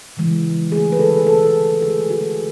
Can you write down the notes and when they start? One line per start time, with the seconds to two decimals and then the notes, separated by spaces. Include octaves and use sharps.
0.17 C#3 E3 G#3
0.72 D3 A3 G#4
0.92 B4
0.99 A4
1.27 B2 A3 A4
1.82 D3 G#3 G#4
2.10 F#4